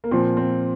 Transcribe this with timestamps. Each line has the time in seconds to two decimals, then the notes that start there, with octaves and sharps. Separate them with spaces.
0.04 A#3
0.11 A#2 F3 C4
0.37 C4